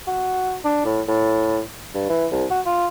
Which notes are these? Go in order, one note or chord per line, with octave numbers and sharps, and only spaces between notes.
F#4
D4
A2
A2
G2
E3
C2
F#4
F4